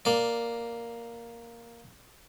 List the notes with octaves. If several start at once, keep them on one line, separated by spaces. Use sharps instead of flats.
A#3 D5